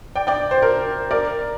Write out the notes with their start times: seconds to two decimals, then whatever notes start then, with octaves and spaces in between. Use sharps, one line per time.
0.16 D5 G5
0.27 D5 G5
0.51 C5
0.62 A#4
1.11 A#4 D5